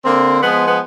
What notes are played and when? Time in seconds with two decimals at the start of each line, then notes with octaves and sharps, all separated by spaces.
0.04 D3 A#3 C4
0.41 F3 G#3 B3
0.67 B3